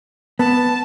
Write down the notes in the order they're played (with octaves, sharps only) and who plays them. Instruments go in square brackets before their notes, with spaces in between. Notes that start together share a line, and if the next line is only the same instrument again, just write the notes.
[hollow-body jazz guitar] B3 [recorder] A5